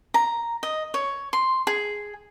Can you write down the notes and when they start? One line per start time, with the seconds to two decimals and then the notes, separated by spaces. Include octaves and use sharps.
0.14 A#5
0.63 D#5
0.94 C#5
1.33 C6
1.67 G#4